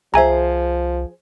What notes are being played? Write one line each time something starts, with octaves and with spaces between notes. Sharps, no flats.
C2 F3 G#4 C5 E5 G#5 A#5